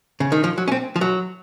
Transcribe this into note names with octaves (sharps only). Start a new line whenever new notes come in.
C#3
D#3
F3
F#3
C#4
C4
F3
F#3